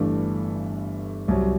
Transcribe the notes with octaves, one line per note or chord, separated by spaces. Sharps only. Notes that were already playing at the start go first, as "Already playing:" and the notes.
Already playing: G1 G2 E3 A3 D4
C2 C3 F#3